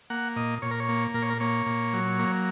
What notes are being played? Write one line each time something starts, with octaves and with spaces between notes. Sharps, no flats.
A#3 F#5
A#2 D#5
A#2 C#5
A#4
C#5
A#3
A#2 A#4
C#5
A#4
A#3 C#5
A#2
F#3
A#3